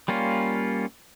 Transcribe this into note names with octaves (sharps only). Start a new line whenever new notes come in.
G3 A#3 C#4 F4